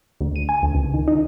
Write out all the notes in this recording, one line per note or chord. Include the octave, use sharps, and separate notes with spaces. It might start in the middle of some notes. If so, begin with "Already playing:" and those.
D2
D#7
G#5
D2
C#2
D#3
D#4